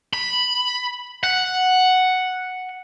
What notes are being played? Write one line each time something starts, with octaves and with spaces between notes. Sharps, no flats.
B5
F#5